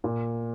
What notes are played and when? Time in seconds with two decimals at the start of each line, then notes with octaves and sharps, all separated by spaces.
0.04 A#2